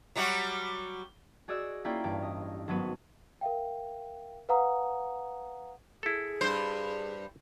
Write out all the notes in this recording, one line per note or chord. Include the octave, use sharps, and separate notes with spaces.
F#3 G3 F#4
F#4 G#4 D5 D#5 E6 F#6
A#3 C#4 E4 F4 D5 G5
A1 G2 G4
D#5
G#1 F#3 B3 D#7
A#4 E5 F5 G5
B4 F5 F#5 A#5 D#6
E4 G#4 A4
G2 C5